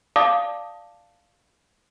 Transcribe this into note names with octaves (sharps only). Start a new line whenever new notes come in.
D5 F5 A5 D6 D#6